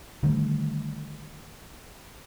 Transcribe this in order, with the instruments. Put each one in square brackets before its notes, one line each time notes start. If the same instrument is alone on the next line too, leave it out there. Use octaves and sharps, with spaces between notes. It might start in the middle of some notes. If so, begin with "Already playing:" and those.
[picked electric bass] D3 D#3 G3 A3